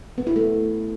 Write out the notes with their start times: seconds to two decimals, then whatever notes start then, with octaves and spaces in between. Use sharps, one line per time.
0.18 B3
0.27 E4
0.36 A3